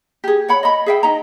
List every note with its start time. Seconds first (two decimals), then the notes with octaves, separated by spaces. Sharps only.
0.24 G4 G#4
0.48 C#5 F#5 B5
0.63 D#5 B5
0.86 G#4 E5 G5
1.03 D#4 D#5 A#5